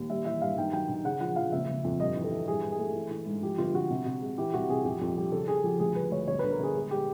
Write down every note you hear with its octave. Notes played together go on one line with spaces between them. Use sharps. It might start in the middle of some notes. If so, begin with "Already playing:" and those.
Already playing: D#2
G3 E5
E3 E5
G2 F5
D#3 G5
F#3 G5
D#3
C#3 F#5
F3 F#5
F3 F5
F#1 E5
F#1
F2
G2 D#5
E3
A4
E3
G2 G#4
G2
G#4
A3
E3
E3
G#2
F3 G4
G1 F4
G1 F#4
C3
C3
G#3
E3 G4
C2 F#4
C3 G#4
F2 G4
F2
G3 G4
C#3 A4
C#3 G#4
F3 G4
D2 G#4
D2 B4
D2 C#5
G1 C#5
D3 B4
A#4
G1 G#4
G#3
G#3 G4